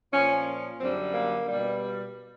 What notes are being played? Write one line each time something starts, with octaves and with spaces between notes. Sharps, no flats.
A#2 F3 C#4
F#2 D3 G3 C4
A#3
B2 G3